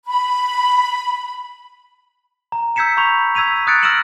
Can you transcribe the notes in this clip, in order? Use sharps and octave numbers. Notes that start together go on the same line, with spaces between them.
B5
A#5
E6 G6 G#6 B6 C#7 E7
A#5 B5 C#6 G6 F7
E6 G#6 B6 D#7 F7
D#6 F#6 G#6 A6 C#7 D7
E6 F6 A#6 D7 E7 F#7